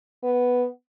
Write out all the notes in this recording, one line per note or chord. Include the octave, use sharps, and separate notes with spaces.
B3